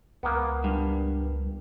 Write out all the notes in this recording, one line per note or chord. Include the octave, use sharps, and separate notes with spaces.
C#2 A#3 B3
G2